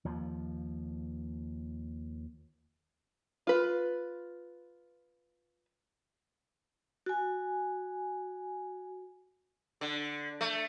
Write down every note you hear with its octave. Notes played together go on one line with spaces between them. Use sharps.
D#2 F3
F4 B4
F#4 G#5
D3
A3